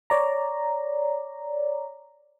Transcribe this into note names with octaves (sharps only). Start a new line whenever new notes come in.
C#5 D5 A#5